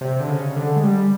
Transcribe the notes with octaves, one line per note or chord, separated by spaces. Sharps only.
C3
D3
C#3
D3
G#3
G3